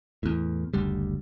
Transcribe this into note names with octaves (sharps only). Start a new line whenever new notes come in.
E2 A2
F#1 D2 G3